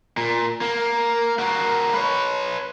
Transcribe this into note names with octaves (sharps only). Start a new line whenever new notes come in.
A#2
A#3
A#3 F#4
B4 C#5